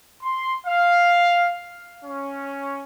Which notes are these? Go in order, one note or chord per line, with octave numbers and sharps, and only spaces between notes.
C6
F5
C#4